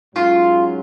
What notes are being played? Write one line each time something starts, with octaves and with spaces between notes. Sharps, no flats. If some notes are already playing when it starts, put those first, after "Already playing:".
G#2 F#3 C#4 F4